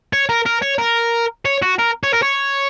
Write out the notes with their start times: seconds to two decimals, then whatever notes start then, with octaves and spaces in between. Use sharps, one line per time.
0.13 C#5
0.29 A#4
0.46 A#4
0.62 C#5
0.79 A#4
1.45 C#5
1.62 F#4
1.78 A#4
2.03 C#5
2.13 A#4
2.22 C#5